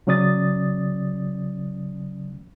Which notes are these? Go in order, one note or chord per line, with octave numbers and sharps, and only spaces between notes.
C#3 F#3 C#4 D5 D#6 A6